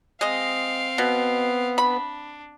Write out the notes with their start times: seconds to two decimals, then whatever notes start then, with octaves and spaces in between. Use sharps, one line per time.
0.21 G#3 C4 D#5 F5
0.98 B2 B3
1.78 D4 B5